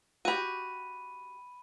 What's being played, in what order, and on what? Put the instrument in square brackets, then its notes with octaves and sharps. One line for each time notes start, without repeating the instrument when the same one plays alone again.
[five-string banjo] F#4 G4 [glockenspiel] B5 D#7